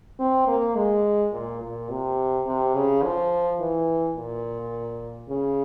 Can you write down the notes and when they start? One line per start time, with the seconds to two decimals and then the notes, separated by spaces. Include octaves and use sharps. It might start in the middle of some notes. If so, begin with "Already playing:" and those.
0.19 C4
0.48 A#3
0.76 G#3
1.33 A#2
1.61 A#2
1.89 C3
2.46 C3
2.74 C#3
3.03 F3
3.59 E3
4.16 A#2
5.29 C#3